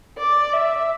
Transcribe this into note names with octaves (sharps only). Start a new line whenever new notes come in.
D5
E5